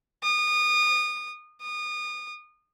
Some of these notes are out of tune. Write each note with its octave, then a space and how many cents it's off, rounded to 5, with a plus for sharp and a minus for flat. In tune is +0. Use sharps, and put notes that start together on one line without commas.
D#6 -30
D#6 -30